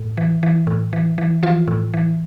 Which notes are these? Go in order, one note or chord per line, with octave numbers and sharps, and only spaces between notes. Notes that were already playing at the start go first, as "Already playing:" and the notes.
Already playing: A2
E3
E3
A2
E3
E3
E3 F3 F4
A2
E3